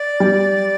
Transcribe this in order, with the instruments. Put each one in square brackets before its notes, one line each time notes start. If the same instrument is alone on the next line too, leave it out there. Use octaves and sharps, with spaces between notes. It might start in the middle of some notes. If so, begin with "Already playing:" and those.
Already playing: [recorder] D5
[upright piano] G3